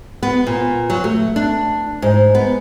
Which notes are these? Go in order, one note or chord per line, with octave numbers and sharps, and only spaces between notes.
B3
A#2
F#3
A3
D4
G#2
B3